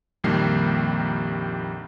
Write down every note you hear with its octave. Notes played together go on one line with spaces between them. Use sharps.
A#1 F2 D#3 G3 A#3 C7